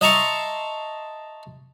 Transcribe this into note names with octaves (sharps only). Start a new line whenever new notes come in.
D#5 E5 A5 A#5 C6 C#6